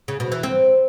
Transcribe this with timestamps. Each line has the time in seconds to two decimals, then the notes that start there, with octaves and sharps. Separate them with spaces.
0.08 C#3
0.20 B2
0.32 E3
0.43 C4